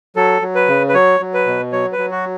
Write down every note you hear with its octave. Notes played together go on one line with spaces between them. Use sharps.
F#3 A4
F#3
B4
C#3
B4
F#3 C#5
F#3
B4
B2
F#3 C#5
B4
F#3
F#4